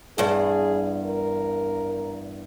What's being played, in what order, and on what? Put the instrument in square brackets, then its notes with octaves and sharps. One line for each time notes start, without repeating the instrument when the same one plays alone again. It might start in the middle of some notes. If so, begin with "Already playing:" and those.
[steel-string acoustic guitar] E2 G2 [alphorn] G#4
[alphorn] A#4